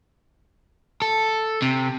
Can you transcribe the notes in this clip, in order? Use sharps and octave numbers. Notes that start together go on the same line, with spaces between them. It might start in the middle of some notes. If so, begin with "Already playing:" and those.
A4
C3